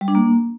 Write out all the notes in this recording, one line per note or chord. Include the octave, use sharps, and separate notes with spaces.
G3
D4
A#3